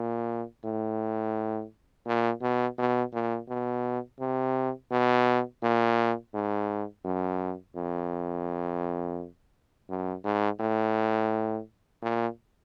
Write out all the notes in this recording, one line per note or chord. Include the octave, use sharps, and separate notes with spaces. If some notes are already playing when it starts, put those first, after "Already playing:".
Already playing: A#2
A2
A#2
B2
B2
A#2
B2
C3
B2
A#2
G#2
F#2
F2
F#2
G#2
A2
A#2